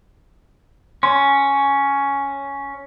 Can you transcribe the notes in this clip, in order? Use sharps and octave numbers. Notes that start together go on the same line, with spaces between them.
C#4 C6